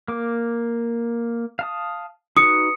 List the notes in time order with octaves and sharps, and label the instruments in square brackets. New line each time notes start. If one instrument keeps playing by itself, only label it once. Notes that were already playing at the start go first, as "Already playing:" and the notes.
[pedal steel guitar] A#3 D6
F5 A5 D#6
[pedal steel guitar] D#4 F#4 B4 [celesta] D#6 C#7